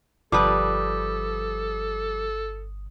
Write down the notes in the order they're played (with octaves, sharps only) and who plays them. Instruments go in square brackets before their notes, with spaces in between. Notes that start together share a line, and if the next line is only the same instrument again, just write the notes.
[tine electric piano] G1 D#6 [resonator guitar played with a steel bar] F3 G3 B4 [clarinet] A4 [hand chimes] D6